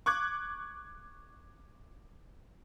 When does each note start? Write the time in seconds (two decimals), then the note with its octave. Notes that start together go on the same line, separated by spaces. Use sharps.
0.06 C#6 D6 F#6 G#6